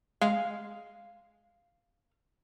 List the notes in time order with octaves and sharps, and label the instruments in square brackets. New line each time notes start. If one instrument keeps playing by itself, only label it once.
[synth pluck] G#3 [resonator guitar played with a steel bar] F5